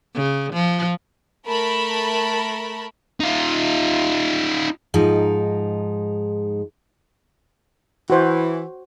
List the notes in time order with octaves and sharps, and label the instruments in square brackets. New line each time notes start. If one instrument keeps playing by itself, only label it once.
[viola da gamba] C#3
F3
[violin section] A3 A#4 A5 B5
[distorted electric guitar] D#4 F4
[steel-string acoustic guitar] G#2 F3 D#4
[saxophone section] E3 [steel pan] F#4 C5